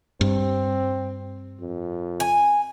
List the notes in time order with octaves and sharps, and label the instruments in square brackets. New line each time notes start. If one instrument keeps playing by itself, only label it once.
[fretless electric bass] G2 [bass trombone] C4
[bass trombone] F2
[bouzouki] G#5